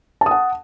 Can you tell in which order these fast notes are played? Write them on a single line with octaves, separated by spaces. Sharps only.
A5 D#6 F#5